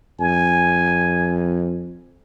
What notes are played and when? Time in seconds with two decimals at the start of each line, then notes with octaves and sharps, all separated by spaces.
0.20 F2 G#5